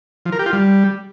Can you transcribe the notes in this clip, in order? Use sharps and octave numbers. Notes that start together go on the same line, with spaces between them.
F3
A#4
G4
F4
G3